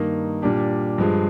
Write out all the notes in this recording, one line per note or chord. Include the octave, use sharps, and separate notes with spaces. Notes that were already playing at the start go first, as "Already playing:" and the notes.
Already playing: G2 D#3 A#3 D#4
A#2 G3 D4 G4
G2 F3 G#3